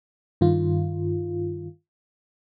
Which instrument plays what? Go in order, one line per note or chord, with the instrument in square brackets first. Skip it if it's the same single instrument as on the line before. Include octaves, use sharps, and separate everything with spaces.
[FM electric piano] G2 D#3 F4